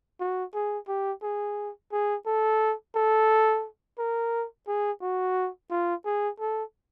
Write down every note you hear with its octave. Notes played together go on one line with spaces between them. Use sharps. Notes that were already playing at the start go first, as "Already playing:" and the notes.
F#4
G#4
G4
G#4
G#4
A4
A4
A#4
G#4
F#4
F4
G#4
A4